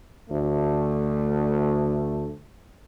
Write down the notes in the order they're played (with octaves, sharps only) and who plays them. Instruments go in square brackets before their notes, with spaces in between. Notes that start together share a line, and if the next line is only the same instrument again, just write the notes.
[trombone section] D2 A3